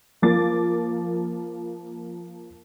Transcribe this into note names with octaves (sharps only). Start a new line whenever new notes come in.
F3 A#3 D6 A6